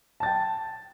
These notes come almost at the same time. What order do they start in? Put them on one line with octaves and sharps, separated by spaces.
A5 A6 G5